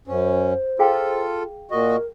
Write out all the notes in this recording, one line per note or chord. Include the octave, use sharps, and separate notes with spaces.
F#2 C#4 C5
F4 G#4 A4 F5 G5
A#2 F#4 A#4 D#5